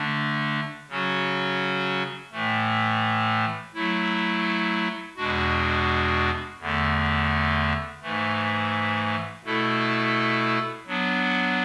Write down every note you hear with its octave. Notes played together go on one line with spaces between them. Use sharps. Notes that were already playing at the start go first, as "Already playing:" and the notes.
Already playing: D3 A3 D4
C#3 F#3 C#4 F#4
A2 E3 A3
F#3 A3 E4
E2 B2 G#3 D4 F#4
E2 D3 A3
G#2 E3 A3
B2 A3 E4 A4
F#3 B3 D4